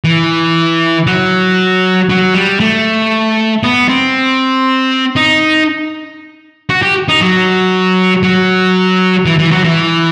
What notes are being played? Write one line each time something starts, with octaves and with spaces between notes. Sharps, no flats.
E3
F#3
F#3
G3
A3
B3
C4
D#4
F#4
G4
D#4
F#3
F#3
E3
E3
F#3
E3